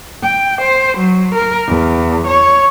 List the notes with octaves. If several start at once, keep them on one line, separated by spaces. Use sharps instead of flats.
G5
C5
F#3
A#4
E2
C#5